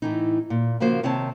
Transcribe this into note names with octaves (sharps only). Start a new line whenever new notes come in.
A2 E3 D#4
A#2
C#3 F3 A#3 F#4 C5
C3 D#3 C4 C#5 A5